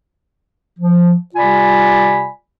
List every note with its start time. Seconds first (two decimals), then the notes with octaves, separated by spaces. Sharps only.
0.79 F3
1.35 C3 G3 F4 D5 G#5 B5